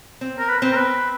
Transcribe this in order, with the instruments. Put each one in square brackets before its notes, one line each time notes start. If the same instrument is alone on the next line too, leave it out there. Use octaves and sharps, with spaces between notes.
[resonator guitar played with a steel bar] C4
[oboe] A#4
B4
[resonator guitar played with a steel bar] C4
[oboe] A#4
B4